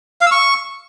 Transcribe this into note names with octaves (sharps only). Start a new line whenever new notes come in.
F5
E6
C#6